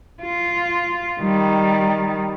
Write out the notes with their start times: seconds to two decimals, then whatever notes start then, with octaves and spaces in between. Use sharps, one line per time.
0.22 F4
1.21 D#3 G3